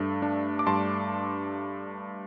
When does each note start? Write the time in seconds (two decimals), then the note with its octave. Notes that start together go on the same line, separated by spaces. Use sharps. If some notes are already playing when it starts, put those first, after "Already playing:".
Already playing: G2 A3 D4
0.22 D4
0.59 D6
0.67 G2 A5 C6